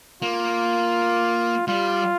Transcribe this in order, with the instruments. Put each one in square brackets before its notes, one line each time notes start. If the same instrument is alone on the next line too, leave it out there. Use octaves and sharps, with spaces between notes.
[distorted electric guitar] A#3 [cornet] F4
[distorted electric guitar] G3 [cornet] F4